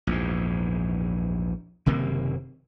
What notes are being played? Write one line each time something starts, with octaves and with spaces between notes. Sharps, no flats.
A#1 E2 G#2
F#1 C3 D#3 A#3